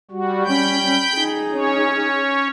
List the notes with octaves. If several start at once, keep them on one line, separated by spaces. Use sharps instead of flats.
G3 F#4
G3 C#4 G5 B5 G6
D#4 G#4
C#4 C#5